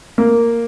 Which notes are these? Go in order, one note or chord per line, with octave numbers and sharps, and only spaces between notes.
A#3